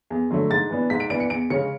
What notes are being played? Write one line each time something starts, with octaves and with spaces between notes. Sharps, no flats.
E2
D3 F#3 A3
G#2 A6
E3 B3 D4
G#2 B6
D7
E3 B3 D4 D7
C#7
E2 D7
C#3 G#3 C#4 C#7